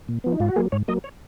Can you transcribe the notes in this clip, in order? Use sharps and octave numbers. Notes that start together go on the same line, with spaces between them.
A#2
F3 B3
D#4
G#2 F4
F#4
F#3 A#3 G#4
G#2 C#5
F#3 A#3 D#5
C#5